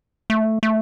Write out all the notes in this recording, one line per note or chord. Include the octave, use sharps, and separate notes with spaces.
A3
A3